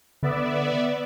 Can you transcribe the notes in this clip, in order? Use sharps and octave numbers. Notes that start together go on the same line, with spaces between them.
D3 B3 D5 E5